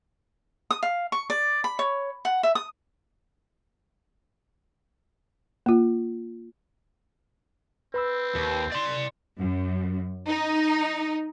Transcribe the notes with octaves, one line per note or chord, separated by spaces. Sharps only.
D#6
F5
C#6
D5
B5
C#5
F#5
E5
D#6
A#3 F4
C4 B4 B5 E6
D#2
D5 C6
F#2
D#4